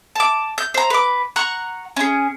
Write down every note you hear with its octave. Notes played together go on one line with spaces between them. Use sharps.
A5 D6
G6
C5 A#5
B4 D6
F#5 A#5 C#6 F#6
C#4 G#4